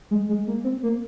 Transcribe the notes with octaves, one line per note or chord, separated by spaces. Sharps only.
G#3
G#3
A#3
C4
A#3